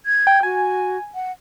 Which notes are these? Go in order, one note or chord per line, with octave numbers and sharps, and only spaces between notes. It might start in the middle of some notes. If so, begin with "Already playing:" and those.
G#6
G5
F#4 G#5
F#5